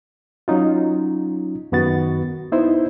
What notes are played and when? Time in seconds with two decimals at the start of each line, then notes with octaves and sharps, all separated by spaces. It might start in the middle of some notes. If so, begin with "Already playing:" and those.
0.48 F#3 C#4 D#4 F4
1.72 F#2 D#3 B3 F#4 A6
2.52 B3 D#4 E4 C5